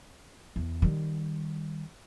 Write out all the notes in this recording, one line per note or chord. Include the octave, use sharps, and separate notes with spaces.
E2
D#3 G3